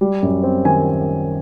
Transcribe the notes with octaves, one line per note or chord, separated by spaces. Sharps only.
G3
F#2
C4
D#3 G#5